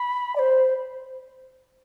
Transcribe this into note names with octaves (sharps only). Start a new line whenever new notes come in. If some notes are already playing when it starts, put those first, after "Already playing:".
Already playing: B5
D5
C5